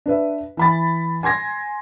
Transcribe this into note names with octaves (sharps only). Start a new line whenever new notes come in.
D4 B4 E5
E3 B5 A6
G#5 C6 G#6 A#6